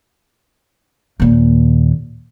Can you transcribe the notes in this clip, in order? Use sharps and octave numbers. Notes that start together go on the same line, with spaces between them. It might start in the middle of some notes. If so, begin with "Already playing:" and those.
D#2 A#2